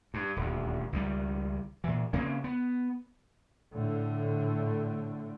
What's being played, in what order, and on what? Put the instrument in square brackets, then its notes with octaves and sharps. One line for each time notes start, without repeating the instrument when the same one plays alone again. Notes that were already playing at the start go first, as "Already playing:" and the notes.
[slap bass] G2
D#1 D2
C#2 D#3 G3
A#2 E3
C#3 A#3 C4 C#4
B3
[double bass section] A2 D3